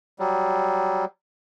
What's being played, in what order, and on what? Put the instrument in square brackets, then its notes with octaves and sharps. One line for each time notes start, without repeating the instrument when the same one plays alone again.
[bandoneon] F#3 G3